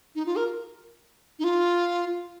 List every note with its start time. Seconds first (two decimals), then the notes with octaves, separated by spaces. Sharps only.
0.15 D#4
0.26 F4
0.36 A#4
1.39 D#4
1.44 F4